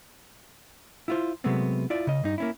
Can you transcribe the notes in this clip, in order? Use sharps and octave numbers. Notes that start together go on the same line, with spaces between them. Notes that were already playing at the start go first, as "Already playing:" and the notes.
E4 F4 C5
C3 F#3 G#3 A3 B3 C4
E4 F4 D5
C#3 D#5
G2 D#4
A#3 C#4 E4